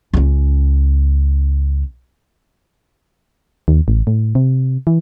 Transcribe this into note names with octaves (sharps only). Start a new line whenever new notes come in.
C#2 C#4
D#2
A1
A2
C3
E3